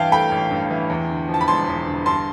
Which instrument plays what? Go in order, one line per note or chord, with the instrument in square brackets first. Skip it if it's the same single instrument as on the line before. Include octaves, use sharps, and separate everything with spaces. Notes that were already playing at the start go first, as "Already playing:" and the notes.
Already playing: [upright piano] G2 E3 F5 G5 A5
A3 G5 B5
A1
G2
E3
E2
D3
F3
A5
B5
E1 A5 C6
E2
D3
G2 A5 C6